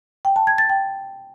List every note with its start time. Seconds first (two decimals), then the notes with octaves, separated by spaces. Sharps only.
0.25 G5
0.36 A5
0.47 G#6
0.58 A6
0.70 G5